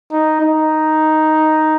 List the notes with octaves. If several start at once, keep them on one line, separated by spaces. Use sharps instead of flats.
D#4
D#4